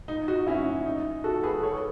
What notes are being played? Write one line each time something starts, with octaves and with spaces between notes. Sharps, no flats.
D#4
D#4 F#4
C#4 E4
D#4
F#4 A4
G#4 B4
A4 C#5